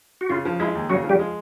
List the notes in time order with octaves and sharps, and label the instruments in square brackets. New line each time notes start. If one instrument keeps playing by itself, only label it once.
[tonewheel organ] F#4
[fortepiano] C#3 [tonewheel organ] F4
[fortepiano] F3
[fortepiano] G#3 [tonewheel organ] E4
[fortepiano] D#2
[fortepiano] C#3 [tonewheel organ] F#3 F#4
[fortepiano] F3
[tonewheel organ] G3 G4
[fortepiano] G#3